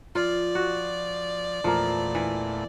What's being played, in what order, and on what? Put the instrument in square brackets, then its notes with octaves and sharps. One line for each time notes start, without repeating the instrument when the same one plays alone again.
[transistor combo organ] F3 [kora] F4 [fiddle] D5
[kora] F#4
[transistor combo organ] E2 A#2 A3 [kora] F3 A#3
[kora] E3